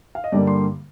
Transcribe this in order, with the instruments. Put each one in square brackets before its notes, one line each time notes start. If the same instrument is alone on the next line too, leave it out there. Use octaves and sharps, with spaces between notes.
[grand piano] F5
D#5
G2 D3 G3 A#3 D5
C6